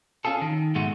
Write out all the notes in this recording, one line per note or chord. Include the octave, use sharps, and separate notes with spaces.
C#4 D4 F4 G#4 A4
D#3
G#2 B2 G#3 A3 F#4